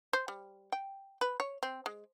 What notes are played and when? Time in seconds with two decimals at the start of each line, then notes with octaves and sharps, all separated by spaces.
0.13 C5
0.28 G3
0.72 G5
1.21 B4
1.40 C#5
1.63 C4
1.86 G#3